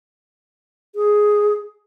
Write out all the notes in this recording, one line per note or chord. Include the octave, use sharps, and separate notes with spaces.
G#4